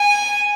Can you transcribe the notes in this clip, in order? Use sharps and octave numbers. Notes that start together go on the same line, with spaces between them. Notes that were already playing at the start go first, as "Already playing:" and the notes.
Already playing: G#5